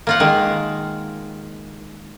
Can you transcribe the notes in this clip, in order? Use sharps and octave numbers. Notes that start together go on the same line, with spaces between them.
A#3 F4 F#5
D#3 G#3